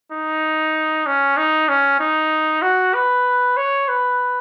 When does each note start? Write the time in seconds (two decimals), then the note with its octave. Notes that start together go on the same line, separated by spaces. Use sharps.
0.12 D#4
1.07 C#4
1.37 D#4
1.69 C#4
2.00 D#4
2.62 F#4
2.94 B4
3.57 C#5
3.88 B4